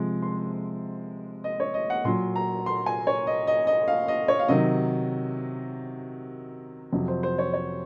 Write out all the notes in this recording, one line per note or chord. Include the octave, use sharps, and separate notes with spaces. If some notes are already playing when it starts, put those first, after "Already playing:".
Already playing: C3 F3 G#3
C6
D#5
C#5
D#5
F#5
A#2 F#3 C6
A#5
C6
G#5
C#5
D#5
D#5
D#5
F5
D#5
C#5
F5
C3 D#3 F#3 D#5
F2 C3 F#3
C5
C5
C#5
C#5